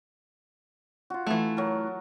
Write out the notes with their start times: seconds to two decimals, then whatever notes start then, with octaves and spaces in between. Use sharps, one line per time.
1.10 F4 F#4
1.27 E3 A3
1.57 F#3 A#4